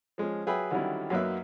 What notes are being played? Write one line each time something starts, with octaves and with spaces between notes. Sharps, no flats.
F3 G#3 C#4
F#3 G#4 B4 E5 G5 B5
D3 D#3 F#3 G3 C#4 E4
F#2 F#3 A#3 D#4 B4 E5